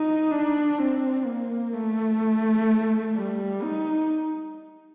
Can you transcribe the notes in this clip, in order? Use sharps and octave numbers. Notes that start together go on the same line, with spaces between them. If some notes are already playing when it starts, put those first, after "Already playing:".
Already playing: D#4
D4
C4
A#3
A3
G3
D#4